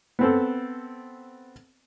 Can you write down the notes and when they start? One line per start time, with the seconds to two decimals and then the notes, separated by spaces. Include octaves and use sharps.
0.19 B3 C4 A4